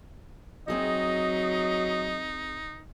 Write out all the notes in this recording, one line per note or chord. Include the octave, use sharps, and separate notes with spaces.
F#3 C4 D#4 G#4 D#5 E5